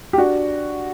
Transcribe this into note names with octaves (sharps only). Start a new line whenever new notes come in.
G4
D4 F#4